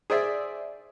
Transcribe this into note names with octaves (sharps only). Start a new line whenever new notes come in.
G#4 C5 D5 E5